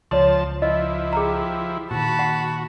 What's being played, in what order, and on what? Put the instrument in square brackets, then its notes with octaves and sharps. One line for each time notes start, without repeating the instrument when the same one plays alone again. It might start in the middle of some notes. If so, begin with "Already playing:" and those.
[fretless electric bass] C#2 [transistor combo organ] F3 A5 [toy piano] C#5 C6
[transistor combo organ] F3 E4 [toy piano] D#5
[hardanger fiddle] G4 [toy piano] G#4 A#5
[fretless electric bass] A#2 D#3 [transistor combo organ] F#4 [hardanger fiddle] A5 B5
[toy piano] F#5